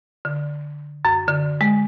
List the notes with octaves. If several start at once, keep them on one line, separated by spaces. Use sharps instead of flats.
D3
F#2
D3
G#3